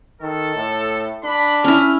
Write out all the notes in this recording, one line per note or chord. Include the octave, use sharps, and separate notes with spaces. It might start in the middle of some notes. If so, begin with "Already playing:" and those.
D#3 A4
A2
D4 B5
C#4 E4 F6